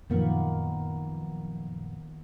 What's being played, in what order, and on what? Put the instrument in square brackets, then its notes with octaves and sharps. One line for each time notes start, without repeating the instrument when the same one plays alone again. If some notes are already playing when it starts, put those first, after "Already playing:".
[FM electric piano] F#2 A#2 F3 [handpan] D#3 A#3 B3